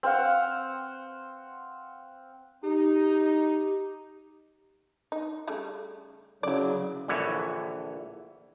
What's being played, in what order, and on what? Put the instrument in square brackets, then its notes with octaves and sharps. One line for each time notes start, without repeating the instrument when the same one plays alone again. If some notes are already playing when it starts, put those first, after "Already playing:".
[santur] C4 C5 F5 F#5
[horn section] D#4 [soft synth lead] G4
[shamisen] D#4
C#3 G3 A3
[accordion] C#3 F#3 [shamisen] E4 D5
[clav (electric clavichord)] A#1 D3 E3 C#5